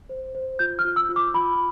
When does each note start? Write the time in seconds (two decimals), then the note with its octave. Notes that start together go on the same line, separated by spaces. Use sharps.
0.09 C5
0.35 C5
0.59 F4 G6
0.79 F6
0.85 F4
0.96 E6
1.09 F4
1.16 D6
1.34 F4 B5